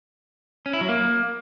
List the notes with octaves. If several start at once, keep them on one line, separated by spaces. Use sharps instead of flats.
C#4
E4
F#3
A#3